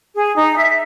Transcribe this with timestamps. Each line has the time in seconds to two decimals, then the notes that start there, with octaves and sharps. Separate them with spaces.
0.15 G#4
0.36 D#4
0.56 E5